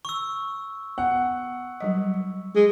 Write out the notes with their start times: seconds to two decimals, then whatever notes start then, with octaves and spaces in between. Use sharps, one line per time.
0.05 C#6 E6
0.98 B3 F#5
1.81 F#3 G3 D#5
2.56 G#3